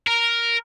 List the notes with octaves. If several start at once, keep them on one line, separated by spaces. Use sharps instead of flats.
A#4